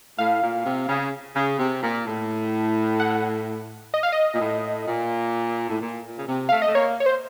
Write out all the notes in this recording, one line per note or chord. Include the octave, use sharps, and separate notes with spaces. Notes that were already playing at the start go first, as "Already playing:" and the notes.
A2 F5
A#2
C3
C#3
C#3
C3
A#2
A2
F#5
D#5
F5
D#5
A#2
A2
A#2
A2
A#2
A#2
C#3
C3
A3 F5
D#5
A3
A#3 C#5
C#5
C5